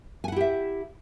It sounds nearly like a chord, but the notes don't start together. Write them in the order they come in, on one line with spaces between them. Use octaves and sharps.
G#5 F#5 E4 G4 E5